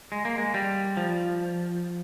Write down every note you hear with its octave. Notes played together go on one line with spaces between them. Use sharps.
G#3
A#3
G#3
G3
F3